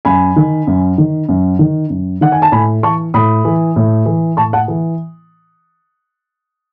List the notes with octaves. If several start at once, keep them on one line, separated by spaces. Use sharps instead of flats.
F#2 G#5 B5
D#3
F#2
D#3
F#2
D#3
F#2
D#3 F#5
G#5
A5
A2 G#5 B5
E3 A5 C#6
A2 B5 D#6
E3
A2
E3
A2 A5 C#6
F#5 A5
E3